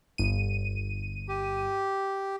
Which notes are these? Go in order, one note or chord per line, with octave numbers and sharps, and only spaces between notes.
G1 D#7
G4